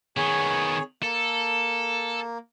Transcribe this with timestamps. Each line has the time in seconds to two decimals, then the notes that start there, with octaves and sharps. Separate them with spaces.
0.17 D#3 B3 G#4 C#5
1.03 A#3 A4